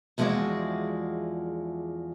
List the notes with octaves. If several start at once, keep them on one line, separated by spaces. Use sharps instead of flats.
E2 F3 G#3 E4 F#4 D5